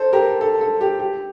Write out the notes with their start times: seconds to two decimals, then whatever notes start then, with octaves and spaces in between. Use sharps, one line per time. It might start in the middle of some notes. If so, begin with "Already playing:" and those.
Already playing: A4 C5
0.13 G4 A#4
0.41 A4
0.61 A4
0.81 G4
0.99 G4